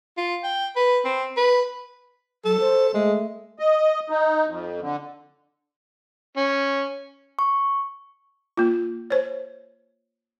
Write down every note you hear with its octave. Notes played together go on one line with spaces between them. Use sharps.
F4
G5
B4
C4
B4
F#3 A4
C5
G#3 A3
D#5
D#4
F2
D3
C#4
C#6
A#3 F4
C5 C#5